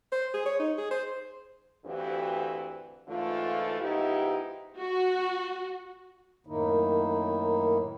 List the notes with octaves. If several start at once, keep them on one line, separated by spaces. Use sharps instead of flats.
C5
G#4
C#5
D#4
G#4
C5
D2 G2 E3 C4 F#4 G4
G#2 D3 E3 A3 F4
G#2 F3 B3 D#4 E4 G4
F#4
F#2 A2 D#3 A#3 D#4 E4